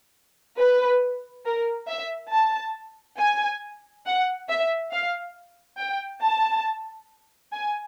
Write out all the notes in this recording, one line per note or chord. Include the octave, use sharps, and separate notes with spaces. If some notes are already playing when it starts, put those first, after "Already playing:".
B4
A#4
E5
A5
G#5
F#5
E5
F5
G5
A5
G#5